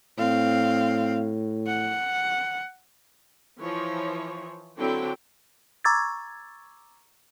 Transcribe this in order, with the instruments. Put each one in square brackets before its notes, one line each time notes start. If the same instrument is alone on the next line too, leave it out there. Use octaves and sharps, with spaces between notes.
[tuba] A2 [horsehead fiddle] C4 F5
[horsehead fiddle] F#5
[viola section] E3 F3 C#5
D3 F#3 C4 D4 E4 G5
[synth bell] A#5 C#6 D6 E6 G#6 A6